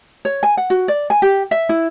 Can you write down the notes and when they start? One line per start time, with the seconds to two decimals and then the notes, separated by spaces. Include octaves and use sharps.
0.25 C#5
0.43 G#5
0.57 F#5
0.70 F#4
0.88 D5
1.10 G#5
1.22 G4
1.51 E5
1.69 E4